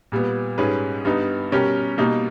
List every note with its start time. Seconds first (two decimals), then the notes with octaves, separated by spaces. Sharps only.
0.12 A#2 G3 B3
0.58 G#2 G3 C#4 G#4 B4
1.05 G2 G3 B3 D#4
1.52 B2 G3 C#4 G4 A#4
1.98 B2 G3 A#3 D#4